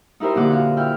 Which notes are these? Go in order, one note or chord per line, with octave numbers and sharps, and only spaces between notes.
D#4 E4 G4 A#4 C5
F2 A#2 D3 G4 F#5 D6
F#4 F5
E4 G5 F6 G6